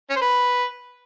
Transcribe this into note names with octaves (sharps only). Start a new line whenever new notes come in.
C#4
C5
B4